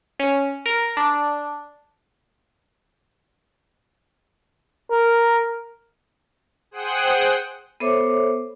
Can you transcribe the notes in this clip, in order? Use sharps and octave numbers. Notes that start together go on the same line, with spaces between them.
C#4
A#4
D4
A#4
G#4 C5 F#5 G5 D#6 F#6
B3 A4 C5 C#5 E5 D6